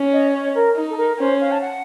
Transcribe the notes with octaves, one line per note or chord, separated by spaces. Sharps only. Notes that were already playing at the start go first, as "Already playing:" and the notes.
Already playing: C#4
D#5
C#5
A#4
D#4
A4
A#4
C#4 C5
F5
A5
F#5